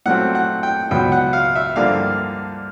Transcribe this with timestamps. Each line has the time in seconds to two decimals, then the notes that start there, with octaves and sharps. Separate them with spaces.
0.06 A#2 F#3 A3 C4 F#5
0.35 F#5
0.63 G5
0.91 C#2 B2 F#3 B3 G5
1.12 F#5
1.33 F5
1.55 E5
1.76 G2 D3 F3 A#3 F5